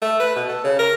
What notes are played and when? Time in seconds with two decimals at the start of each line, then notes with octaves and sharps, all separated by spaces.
0.02 A3
0.20 B4
0.36 B2
0.49 A4
0.64 C#3
0.79 A#4